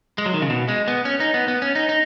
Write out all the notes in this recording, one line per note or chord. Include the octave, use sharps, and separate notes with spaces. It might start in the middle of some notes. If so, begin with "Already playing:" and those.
G#3
F#3
D#3
C#3
B2
G#3
B3
C#4
D#4
B3
B3
C#4
D#4
D#4